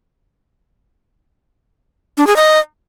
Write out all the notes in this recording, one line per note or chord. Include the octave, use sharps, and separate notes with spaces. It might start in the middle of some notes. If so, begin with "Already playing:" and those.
D4
G#4
D#5